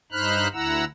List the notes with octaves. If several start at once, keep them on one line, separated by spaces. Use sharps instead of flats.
G2 D#4 C5 B5 F6 F#6
D2 E4 F#5 A#5 E6